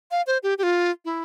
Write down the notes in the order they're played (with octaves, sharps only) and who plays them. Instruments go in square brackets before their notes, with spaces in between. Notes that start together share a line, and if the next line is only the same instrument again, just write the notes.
[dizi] F5
C5
G4
G4
F4
E4